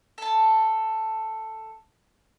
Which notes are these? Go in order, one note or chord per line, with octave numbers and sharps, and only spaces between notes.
A4 A5